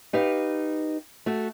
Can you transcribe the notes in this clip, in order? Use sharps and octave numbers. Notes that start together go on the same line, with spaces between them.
D#4 G4 B4 F5
A3 F#4